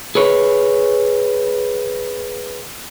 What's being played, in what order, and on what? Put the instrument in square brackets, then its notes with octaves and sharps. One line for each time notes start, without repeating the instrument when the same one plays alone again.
[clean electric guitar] G#4 B4 C#5